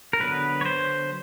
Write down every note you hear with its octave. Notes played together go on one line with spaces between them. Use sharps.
A#4
D3 F#3 B3 B4
C#5
C5